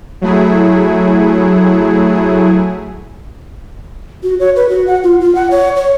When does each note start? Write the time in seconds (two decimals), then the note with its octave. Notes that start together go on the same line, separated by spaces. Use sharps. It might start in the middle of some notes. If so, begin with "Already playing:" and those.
0.21 F#3 A3 E4 G#4
4.23 F#4
4.39 C#5
4.56 B4
4.69 F#4
4.87 F#5
5.03 F4
5.21 F4
5.35 F#5
5.51 C#5
5.76 C#5